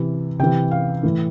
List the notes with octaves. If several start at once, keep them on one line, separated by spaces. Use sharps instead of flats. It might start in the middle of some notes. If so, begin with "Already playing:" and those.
Already playing: C3 E3
C3 E3 G5
F5
A2 E3